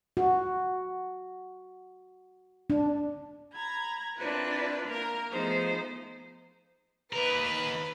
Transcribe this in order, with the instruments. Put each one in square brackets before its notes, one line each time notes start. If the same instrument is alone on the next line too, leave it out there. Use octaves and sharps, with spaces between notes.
[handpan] F#4
D4
[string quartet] A#5 B5 G#6
C4 D4 E4 F4 A#4 B4
A#3 A#4 A#5
F3 A3 B3 D#4 G#4 C5
[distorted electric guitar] D#2 A#4 [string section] B4